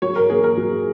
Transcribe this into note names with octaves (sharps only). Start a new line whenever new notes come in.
F#3 C#5
A#4
A#3 G#4
A#4
F#3